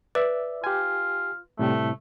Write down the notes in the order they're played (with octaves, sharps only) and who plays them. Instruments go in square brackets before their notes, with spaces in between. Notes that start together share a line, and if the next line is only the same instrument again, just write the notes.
[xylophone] B4 [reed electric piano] D5 E5
[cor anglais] F4 [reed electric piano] G4 G#5
[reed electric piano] A2 C3 G3 [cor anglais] A3